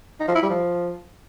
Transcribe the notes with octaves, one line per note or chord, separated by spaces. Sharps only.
D#4
F3
E4
G3
F3